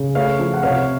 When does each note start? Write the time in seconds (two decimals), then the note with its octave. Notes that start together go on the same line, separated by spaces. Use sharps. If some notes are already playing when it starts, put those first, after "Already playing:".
Already playing: C#3
0.15 A3 C#5 F5
0.39 F3
0.54 F#5
0.63 C3 C#5 F5